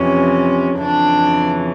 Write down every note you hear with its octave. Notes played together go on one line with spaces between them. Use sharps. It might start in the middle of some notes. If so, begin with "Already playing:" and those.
Already playing: F2 C3 E3 C#4
F2 C#3 E3 D4